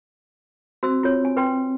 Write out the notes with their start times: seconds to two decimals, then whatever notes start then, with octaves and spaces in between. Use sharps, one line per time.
0.83 C4 F#4 C5 E6
1.03 F4 C#5
1.25 G#5
1.37 B4 G5 C6